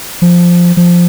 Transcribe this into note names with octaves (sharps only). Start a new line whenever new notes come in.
F3
F3